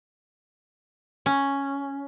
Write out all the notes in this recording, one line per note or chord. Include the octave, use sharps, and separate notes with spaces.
C#4